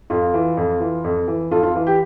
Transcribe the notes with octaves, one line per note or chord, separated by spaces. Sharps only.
F2 F4
E3
F2
E3
F2
E3
F2 F4 A4
F4 A4
E3
G4